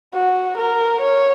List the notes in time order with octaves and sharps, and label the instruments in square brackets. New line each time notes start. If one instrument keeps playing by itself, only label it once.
[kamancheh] F#4
A#4
C#5